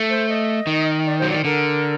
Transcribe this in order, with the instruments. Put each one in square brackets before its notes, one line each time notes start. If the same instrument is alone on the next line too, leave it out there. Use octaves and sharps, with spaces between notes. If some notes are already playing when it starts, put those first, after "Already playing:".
Already playing: [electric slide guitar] A3
[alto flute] C5
D#5
[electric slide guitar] D#3
[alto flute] D5
[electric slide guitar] F#3 [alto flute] C5
[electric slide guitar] D#3 [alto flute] D5
[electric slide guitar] D3 [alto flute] A#4